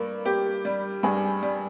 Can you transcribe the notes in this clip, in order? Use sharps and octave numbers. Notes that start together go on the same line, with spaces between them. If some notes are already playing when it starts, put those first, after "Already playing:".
Already playing: G2 A#3
A#3 G4
G3
G2 G#4
G3